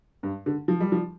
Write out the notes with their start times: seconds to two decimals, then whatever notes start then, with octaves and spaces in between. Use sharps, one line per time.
0.23 G2
0.46 D3
0.68 F3
0.80 G3
0.92 F3